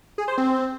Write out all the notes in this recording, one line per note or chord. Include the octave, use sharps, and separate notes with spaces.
G#4
C5
C4